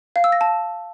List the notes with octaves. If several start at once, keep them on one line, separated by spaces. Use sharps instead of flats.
F5
E6
A#6
A5